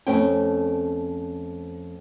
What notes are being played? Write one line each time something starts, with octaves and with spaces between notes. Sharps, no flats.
F2 A3 C4 C#4 G5